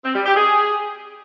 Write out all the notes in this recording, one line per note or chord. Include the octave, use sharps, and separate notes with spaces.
C4
G3
G4
G#4